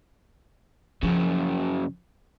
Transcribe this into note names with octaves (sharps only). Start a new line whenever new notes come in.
F#2 C#3 F3